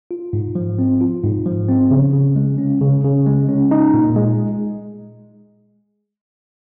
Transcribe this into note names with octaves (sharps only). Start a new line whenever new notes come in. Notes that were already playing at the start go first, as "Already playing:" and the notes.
F4
G#2
F3
C4
F4
G#2
F3
C4
C#3
C#3
G#3
C#4
C#3
C#3
G#3
C#4
D#4
A#2
G#3